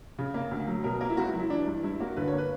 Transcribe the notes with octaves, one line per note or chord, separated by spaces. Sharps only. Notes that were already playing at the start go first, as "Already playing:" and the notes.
C#3
A#3
D2
F#3
B2 A#4
A#3 A#4
E4
C#2 F#4
E4
F#3
E4
E3 D4
G2
G2 E4
A#3 F#4
D3 B4
C#5
A#3
B4